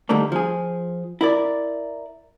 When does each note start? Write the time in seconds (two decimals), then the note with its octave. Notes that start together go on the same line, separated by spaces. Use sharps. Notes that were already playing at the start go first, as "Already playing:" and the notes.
0.09 D3 D#3 G3 A3 A#3
0.32 F3 G#4
1.21 E4 A#4 D5